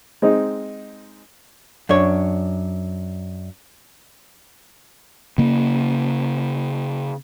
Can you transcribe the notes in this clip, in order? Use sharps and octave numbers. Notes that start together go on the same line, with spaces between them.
G#3 C4 D#4
F#2 D4 C#5
C#3 A#3